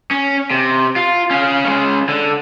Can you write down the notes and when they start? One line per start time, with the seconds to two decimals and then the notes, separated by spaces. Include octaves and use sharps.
0.11 C#4
0.51 C3
0.96 F4
1.31 C#4 F5
1.65 G#3 C#4
2.09 D3